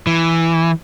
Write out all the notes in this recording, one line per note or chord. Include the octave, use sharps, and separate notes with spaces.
E3